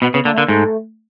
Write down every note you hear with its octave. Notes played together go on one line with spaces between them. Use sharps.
B2 B3
C#3 B3
D3 A#3
A3
D3 A#3
G#2 A3